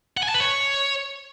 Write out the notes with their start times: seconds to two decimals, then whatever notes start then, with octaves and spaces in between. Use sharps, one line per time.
0.17 F#5
0.23 G#5
0.29 A5
0.34 B4
0.40 C#5